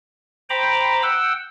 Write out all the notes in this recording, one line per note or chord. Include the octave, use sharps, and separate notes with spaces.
C5 G5 A#5 B5 D6
F#5 G5 E6